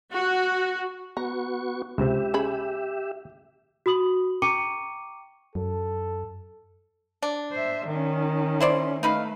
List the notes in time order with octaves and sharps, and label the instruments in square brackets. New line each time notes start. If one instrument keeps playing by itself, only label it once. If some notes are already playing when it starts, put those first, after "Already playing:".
[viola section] F#4
[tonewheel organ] B3 F#4 C#6 [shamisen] A#5
[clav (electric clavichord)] C#2 C3 [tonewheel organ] G4 E5
[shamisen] C#4 G#4 B5
[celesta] F#4 B5 D#6 F#7
G5 A#5 C#6 D6 C#7 D#7
[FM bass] F#2 [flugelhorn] A4
[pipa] D4
[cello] C5 E5
D#3 C#4
[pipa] E4 C5 D5
[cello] A3 [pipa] D#4 B4 F5